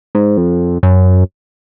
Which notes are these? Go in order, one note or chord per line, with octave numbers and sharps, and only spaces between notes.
G#2
F2
F#2